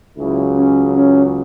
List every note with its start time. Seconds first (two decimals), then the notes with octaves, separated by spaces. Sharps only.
0.17 C#2 C#3 F#3 E4
0.56 C#4
0.95 C#4